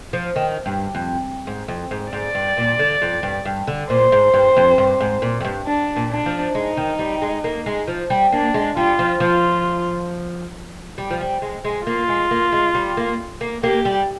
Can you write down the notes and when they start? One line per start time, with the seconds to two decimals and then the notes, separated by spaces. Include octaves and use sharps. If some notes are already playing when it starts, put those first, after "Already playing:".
0.13 F3
0.36 D#3
0.66 G2
0.95 F2
1.47 G#2
1.68 F2
1.91 G#2
2.13 G#2 D5
2.35 G2
2.57 A#2
2.79 D3
3.02 F2
3.23 G2
3.45 G2
3.67 D3
3.90 A#2 C5
4.12 G#2
4.34 G2
4.57 F2
4.78 G2
5.00 G#2
5.22 A#2
5.41 F2
5.45 G2
5.67 D4
5.96 A#2
6.11 D4
6.26 F3
6.55 G#3 D#4
6.77 D#3
6.99 G3
7.22 G#3
7.44 A#3
7.66 G#3
7.88 F3
8.10 G3
8.32 A#3 D4
8.54 G#3
8.77 G3 F4
8.99 F3
9.20 F3 F4
10.98 G3
11.10 F3
11.21 G3
11.42 G#3
11.64 G#3
11.86 A#3 F4
12.09 G#3
12.31 A#3
12.52 G#3
12.75 G3
12.97 A#3
13.41 A#3
13.63 A#3 G4
13.85 G3